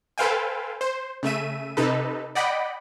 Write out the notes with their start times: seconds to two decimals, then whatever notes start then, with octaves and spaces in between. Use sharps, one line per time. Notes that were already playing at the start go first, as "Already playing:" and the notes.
0.18 A4 B4 C5 F5 G5 G#5
0.81 C5
1.23 C#3 A3 E5 D#7
1.77 C3 D#4 A4 B4
2.35 D5 D#5 F#5 G5 B5